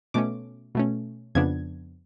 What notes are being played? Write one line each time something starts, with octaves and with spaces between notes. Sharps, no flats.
B2 A3 C#4 D6
B2 A3 C#4
F2 C#3 F3 B3 D4 G#6